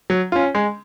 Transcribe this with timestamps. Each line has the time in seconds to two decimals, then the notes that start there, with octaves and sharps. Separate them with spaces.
0.10 F#3
0.32 C#4 F4
0.55 G#3